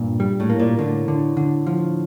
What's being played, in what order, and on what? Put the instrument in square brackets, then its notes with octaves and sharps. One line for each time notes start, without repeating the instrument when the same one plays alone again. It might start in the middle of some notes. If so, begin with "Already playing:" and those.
Already playing: [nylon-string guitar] G2 [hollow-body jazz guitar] A#2
[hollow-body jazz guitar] G3
[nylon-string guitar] A2
[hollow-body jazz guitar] A#3
[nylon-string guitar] A#2
[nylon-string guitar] A2 [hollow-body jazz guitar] D3
[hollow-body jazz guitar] D3
D3
F3